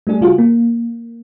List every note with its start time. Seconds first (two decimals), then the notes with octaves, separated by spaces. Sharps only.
0.07 G3 A3 D4 G#4
0.21 C#3 G3 F4 F#4 G#4
0.38 A#3